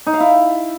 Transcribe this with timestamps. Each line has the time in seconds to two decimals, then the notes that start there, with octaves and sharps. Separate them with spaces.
0.06 D#4
0.13 F5
0.20 E4